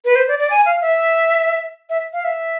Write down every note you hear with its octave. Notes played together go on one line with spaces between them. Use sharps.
B4
C5
D5
D5
G#5
F5
E5
E5
F5
E5